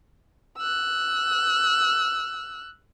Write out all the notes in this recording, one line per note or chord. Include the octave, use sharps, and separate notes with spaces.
E6 F#6